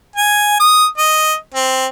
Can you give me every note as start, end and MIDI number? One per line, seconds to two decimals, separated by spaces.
0.16 0.59 80
0.60 0.86 87
0.98 1.35 75
1.54 1.86 60